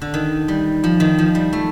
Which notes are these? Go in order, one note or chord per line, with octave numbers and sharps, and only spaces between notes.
D3
D#3
G3
F3
D#3
F3
G3
A3